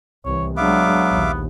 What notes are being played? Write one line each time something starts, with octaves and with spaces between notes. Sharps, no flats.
C2 E3 C#5
F#3 G#3 B3 D4 E5 F5 D6
A#1 D#2